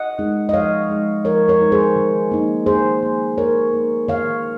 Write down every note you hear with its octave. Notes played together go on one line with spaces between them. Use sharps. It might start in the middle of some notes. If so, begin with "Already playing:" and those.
Already playing: D#5 F#5
G#3 D#4
D#5
F3 C#5 F5
G#3 D#4
F3 A#4 C#5
A#4 C#5
G#3 D#4
G#4 C5
D#3
A#3 D#4
D#3 G#4 C5
A#3 D#4
D#3 A#4 C#5
A#3 D#4
D#3 C#5 F5